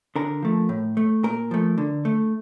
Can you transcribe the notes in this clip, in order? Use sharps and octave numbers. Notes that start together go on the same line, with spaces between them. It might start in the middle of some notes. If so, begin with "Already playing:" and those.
D3 A#4
F3 A3
A2
A3
A#2 A#4
F3 A3
D3
A3